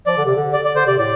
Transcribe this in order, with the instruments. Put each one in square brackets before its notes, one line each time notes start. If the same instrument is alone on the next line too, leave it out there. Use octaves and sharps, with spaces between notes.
[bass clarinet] F3 [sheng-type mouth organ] D5
[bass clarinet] D3
C3
D3
[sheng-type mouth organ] D5
D5
[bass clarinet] D3 [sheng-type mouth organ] C5
[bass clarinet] C3 [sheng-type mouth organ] D5
[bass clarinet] A2 [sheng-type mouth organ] D5